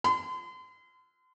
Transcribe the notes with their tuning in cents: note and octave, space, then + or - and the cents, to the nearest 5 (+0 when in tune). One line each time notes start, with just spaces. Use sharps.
C6 -40